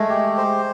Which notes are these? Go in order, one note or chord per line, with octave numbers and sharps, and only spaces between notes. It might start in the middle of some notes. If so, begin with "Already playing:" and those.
Already playing: G#3 A3
G4
C5